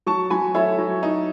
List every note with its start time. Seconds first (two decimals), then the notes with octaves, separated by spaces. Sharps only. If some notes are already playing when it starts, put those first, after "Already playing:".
0.07 F#3 A5 C#6
0.30 F#3 G#5 B5
0.54 E4 A4 C#5
0.78 F#3
1.03 D#4